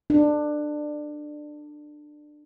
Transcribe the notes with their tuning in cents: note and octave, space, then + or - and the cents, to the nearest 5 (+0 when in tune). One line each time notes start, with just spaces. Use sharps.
D4 +20